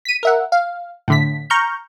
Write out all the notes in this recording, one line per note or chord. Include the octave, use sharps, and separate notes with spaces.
B6 D#7
A#4 E5 F#5
F5
A2 D3 B6
A#5 C#6 F6 G6